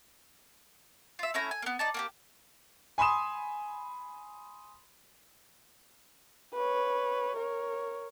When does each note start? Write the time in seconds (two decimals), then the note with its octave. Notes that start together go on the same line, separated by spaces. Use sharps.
1.19 F4 E5
1.34 A3 C#4 E4 A#5
1.51 G#5
1.62 A#3 B3
1.79 D#4 D5 A5
1.94 A#3 F#4 G4
2.98 G#5 B5 C6 D#6 E7
6.54 B4 C#5
7.37 A#4 C#5